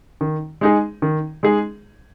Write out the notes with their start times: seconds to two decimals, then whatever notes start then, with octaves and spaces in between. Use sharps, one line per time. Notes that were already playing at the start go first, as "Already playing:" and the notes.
0.21 D#3
0.61 G#3 D#4 G#4
1.02 D#3
1.43 G#3 D#4 G#4